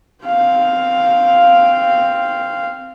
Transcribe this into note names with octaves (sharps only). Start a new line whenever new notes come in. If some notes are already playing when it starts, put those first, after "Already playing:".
C4 F5